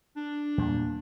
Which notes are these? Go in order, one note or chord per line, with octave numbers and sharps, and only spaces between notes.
D4
E2 A#2 G3